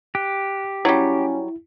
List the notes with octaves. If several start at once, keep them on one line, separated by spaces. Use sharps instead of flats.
G4 F#6
F#3 G3 C#4 E4